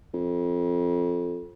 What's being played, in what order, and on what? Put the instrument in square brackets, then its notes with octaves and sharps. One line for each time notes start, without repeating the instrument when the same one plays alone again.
[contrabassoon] F2